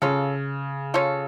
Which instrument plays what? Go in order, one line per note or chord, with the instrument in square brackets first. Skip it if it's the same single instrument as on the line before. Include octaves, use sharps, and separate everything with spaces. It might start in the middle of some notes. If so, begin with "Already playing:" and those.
[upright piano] C#3 [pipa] C#4 F4 A4
[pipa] C#4 F4 A4